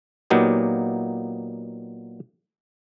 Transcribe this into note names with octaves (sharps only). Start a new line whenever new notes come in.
A#2 F#3 A#3 B3 D#4 G4